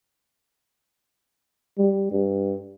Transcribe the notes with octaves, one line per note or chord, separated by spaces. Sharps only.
G3
G2